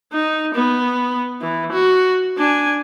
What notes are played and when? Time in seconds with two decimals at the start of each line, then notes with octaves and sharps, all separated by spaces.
0.13 D#4
0.54 B3
1.41 E3
1.71 F#4
2.37 D4 G#5